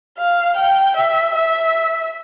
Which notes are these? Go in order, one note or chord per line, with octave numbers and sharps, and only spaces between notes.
F5
G5
E5
E5